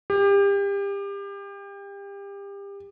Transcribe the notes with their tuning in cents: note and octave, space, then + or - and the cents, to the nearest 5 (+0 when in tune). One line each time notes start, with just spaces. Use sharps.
G4 +30